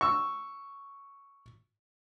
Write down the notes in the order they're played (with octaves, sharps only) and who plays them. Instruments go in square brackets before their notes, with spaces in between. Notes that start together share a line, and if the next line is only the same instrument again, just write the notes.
[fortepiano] C#6 E6